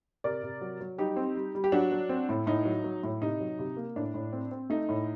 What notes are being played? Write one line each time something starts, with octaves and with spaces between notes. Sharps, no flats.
C3 A#4 D5
C3
F#3
F#3
G3 D#4 G4
C4
G3
G3
G4
F#3 D4 F#4
F#3
C4
A2
A2 D#4
F#3
F#3
A2
C3 D#4
F#3
C3
A#3
A2 D4
A2
C4
C4
A3 D#4
A2